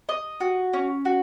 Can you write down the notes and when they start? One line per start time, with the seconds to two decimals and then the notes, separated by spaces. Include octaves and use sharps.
0.09 D#5
0.40 F#4
0.73 C#4
1.05 F#4